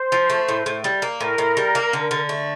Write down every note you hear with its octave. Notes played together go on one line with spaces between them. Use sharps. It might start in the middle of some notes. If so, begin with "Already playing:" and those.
Already playing: C5
F3
A3
A2
A2
G3
A#3
A2 A#4
A2
G3
A#3
D3
D3
A3